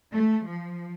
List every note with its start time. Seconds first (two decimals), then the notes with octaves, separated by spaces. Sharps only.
0.13 A3
0.47 F3